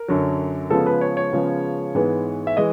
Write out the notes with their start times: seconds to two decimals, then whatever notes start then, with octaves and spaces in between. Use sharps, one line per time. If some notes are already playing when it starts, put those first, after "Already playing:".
Already playing: A#4
0.08 F#2 D3 F#3
0.70 C#3 F3 G#3 B3 A4
0.86 B4
1.01 C#5
1.17 C#5
1.33 C#3 F3 G#3 B3
1.95 G#2 E3 G#3 B3
2.47 E5
2.57 E3 G#3 D#5